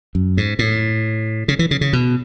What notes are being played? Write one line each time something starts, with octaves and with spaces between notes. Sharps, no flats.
F#2
G#2
A2
C#3
E3
C#3
C#3
B2